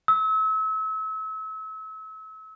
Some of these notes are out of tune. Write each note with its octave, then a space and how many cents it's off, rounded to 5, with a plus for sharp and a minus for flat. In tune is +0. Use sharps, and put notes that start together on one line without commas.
E6 -35